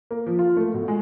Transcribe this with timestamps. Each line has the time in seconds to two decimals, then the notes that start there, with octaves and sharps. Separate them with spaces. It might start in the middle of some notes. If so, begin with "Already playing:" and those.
0.11 A#3
0.27 F3
0.39 F4
0.56 A3
0.74 B2
0.88 G#3